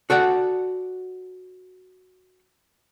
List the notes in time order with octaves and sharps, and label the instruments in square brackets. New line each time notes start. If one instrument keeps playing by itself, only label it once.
[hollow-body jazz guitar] F#4 A4 D5 F#5